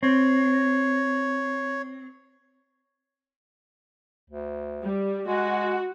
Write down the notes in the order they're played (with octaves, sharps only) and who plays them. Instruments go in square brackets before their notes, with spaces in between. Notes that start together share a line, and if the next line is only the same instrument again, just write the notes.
[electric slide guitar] C4 [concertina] C#5
[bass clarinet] D2
[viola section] G3
[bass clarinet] G#3 [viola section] F#4